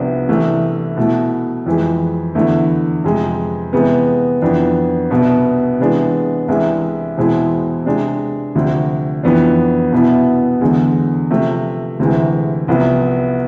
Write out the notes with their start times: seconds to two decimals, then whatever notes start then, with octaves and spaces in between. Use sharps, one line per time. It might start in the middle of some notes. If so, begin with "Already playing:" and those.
Already playing: C2 C3 F3 B3 D4
0.29 C2 C3 E3 A3
0.97 B2 A3 E4
1.66 F2 E3 G#3
2.35 E2 D3 A3 E4
3.04 F2 C3 G#3
3.73 C3 E3 G#3 B3
4.42 F2 E3 B3 D4
5.10 C2 B2 B3
5.79 C3 E3 G#3 B3 D4
6.48 C2 C3 E3 G#3
7.18 E2 B2 G#3 C4 E4
7.85 C3 G#3 D4
8.55 D2 C3 F3
9.23 F2 E3 B3 D4
9.92 C2 B2 B3 E4
10.61 E2 D3 G#3
11.30 C3 F3 A3
11.99 D2 C3 E3 G#3
12.68 C2 C3 F3 B3